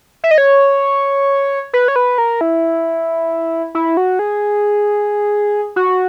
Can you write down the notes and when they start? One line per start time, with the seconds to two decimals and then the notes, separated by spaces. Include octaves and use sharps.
0.24 E5
0.31 D#5
0.38 C#5
1.73 B4
1.88 C#5
1.96 B4
2.18 A#4
2.41 E4
3.75 E4
3.97 F#4
4.19 G#4
5.76 F#4